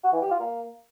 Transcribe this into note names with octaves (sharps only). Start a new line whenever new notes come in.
F#4
E3
G4
F4
A#3